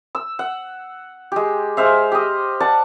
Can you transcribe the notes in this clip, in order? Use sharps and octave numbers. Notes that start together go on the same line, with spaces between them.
E6
F#5
G#3 G4
G#3 C5 E5 F5
G4 D#5
D5 F#5 A5